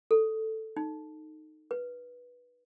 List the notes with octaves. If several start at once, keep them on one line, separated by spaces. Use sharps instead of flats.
A4
D#4
B4